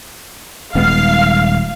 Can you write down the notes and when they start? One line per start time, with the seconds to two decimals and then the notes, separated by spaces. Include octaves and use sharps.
0.75 D#1 G#3 B3 F5